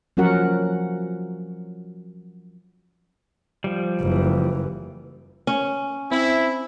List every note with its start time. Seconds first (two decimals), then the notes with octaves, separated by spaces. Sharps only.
0.17 F3 F#3 C#4 F#4 A#4 F#5
3.64 F3 G3
4.00 F#1 E3
5.47 C#4
6.11 C4 E4